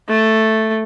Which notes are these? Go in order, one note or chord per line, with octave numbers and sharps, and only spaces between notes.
A3